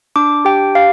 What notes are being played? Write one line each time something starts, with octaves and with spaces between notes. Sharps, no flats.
D4 D6
G4 G5
G4 F5